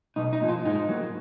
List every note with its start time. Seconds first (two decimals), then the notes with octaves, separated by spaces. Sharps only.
0.16 B1 D#4
0.33 D#4
0.41 A#2 F3
0.49 F4
0.65 G#2 D#4
0.89 F#3 A#3